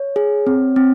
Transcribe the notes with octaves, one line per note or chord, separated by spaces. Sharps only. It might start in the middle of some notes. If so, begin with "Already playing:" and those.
Already playing: C#5
G#4
C4
C4